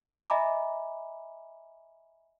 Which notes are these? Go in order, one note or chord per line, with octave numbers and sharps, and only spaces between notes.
D#5 E5 G#5 A#5 B5 D6